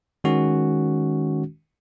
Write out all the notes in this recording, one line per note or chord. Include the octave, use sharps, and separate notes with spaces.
D#3 G#3 C#4 F#4